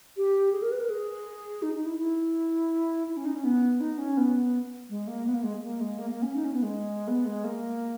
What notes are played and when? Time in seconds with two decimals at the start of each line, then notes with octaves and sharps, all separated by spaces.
0.17 G4
0.52 G#4
0.62 A#4
0.72 B4
0.80 A#4
0.90 G#4
1.62 D#4
1.75 D#4
1.86 E4
1.98 E4
3.07 E4
3.17 C#4
3.25 D#4
3.35 C#4
3.44 B3
3.81 D#4
3.98 C#4
4.17 B3
4.89 G#3
5.08 A#3
5.26 B3
5.34 A#3
5.43 G#3
5.63 A#3
5.80 G#3
5.99 A#3
6.11 A#3
6.22 C#4
6.35 D#4
6.44 C#4
6.54 B3
6.63 G#3
7.08 B3
7.25 G#3
7.44 A#3